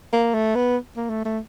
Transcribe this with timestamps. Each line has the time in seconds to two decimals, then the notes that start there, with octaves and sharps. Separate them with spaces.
0.13 A#3
0.34 A3
0.55 B3
0.97 A#3
1.10 A3
1.25 A3